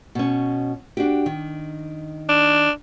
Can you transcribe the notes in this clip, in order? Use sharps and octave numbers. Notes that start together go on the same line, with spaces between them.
B2 C#4
D4 F#4 G4
D#3
D4